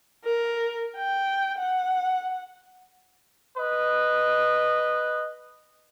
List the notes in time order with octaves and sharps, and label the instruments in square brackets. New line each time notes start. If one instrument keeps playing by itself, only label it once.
[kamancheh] A#4
G5
F#5
[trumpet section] B4 D#5